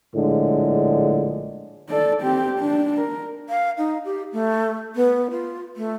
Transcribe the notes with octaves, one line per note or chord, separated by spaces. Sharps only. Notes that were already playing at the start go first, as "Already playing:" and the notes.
A#1 A2 D3 G#3
A4 D5
C4 G4
D4
A#4
F5
D#4
G4
A3
B3
F4
A3